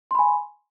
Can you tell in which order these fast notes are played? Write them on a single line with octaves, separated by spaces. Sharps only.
C6 B5 G#5